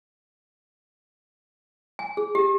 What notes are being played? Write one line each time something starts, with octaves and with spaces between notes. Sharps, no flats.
G#5
G#4
G4